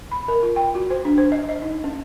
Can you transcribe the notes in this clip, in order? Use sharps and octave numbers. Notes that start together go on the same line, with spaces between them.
B5
A#4
F4
G5
F#4
C5
D4
C5
D#5
D#5
D#4
C#4